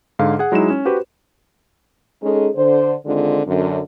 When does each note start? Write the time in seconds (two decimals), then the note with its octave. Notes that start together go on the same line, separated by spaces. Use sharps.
0.19 G#2 D3 F5
0.39 G#4 F#5
0.52 F#3 G#3 D#4 E4 E7
0.70 C#4
0.85 F#4 G4 B4 C5
2.22 G#3 C#4 D#4 G#4 A4
2.56 D3 C5
3.06 D3 D#3 G#3 C4 F4
3.46 F#2 D3